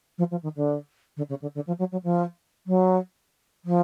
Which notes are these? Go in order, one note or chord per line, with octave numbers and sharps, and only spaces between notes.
F3
F3
D#3
D3
D3
C#3
D3
D3
F3
F#3
F#3
F3
F#3
F3